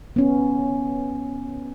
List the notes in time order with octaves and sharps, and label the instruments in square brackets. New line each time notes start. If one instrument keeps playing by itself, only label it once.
[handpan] B3 C#4